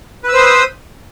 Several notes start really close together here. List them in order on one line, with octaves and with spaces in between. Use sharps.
B4 E6 C5 D#6